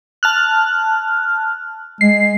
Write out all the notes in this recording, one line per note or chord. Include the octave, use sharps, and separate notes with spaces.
A5 F6 F#6
G#3 C7